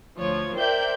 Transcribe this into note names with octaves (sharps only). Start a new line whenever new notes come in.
D2 F3 C#5
A#4 C5 D5 E5 G5 G6